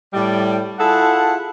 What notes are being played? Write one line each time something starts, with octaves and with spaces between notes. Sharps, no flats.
A2 G3 D5
E4 F4 G#4 A4 F#5 A5